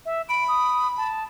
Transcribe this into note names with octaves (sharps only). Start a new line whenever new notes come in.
E5
B5 D7
D#6
A5